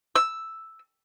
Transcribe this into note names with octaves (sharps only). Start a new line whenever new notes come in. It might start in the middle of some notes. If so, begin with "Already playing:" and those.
E6